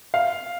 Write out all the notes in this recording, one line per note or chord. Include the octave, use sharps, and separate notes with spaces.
F5